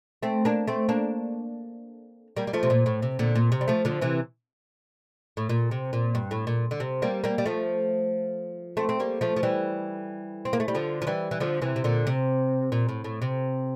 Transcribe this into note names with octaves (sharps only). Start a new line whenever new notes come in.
A3 C4
A#3 D4
A3 C4
A#3 D4
G3 A#3
G3
F3 A3
C3
A#2
A2
C3
A#2 D3
A#2
C3
G3
F3 A3
D3 F3
C3 E3
A2
A#2
C3
A#2
G2
A2
A#2
D3
C3
G3 A#3
G3 A#3
G3
F3 A3
A3 C4
C4
G3 A#3
F3 A3
F3
E3 G3
C4
A#3
A3
G3
D3 F3
F3
E3 G3
E3
D3 F3
C3 E3
C3
A#2 D3
C3
A#2
A2
A2
C3